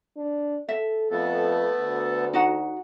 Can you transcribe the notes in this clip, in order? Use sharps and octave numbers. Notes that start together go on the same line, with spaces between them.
D4
A4 E5
F2 A3 B3 A4
D2
D#4 F#4 F#5